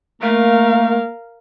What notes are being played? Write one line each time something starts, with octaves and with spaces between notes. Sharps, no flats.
A3 A#3 A#4 F5